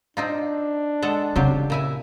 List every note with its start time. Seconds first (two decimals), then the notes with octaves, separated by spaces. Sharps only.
0.17 C4 D4 D#4 F4
1.02 G#3 A4 F#5
1.36 C#3 F#3 C4 F4 G4
1.70 A#2 E4 G#5